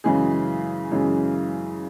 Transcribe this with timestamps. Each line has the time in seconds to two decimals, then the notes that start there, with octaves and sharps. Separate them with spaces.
0.04 F#2 C#3 E3 G#3 G#4
0.92 F#2 C#3 E3 G#3